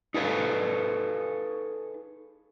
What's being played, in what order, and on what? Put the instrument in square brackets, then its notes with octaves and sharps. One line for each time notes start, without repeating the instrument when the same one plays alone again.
[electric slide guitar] D#4 G#4 A4 B4 C#5 F5